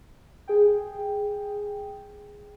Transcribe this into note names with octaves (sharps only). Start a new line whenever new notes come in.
G#4 G5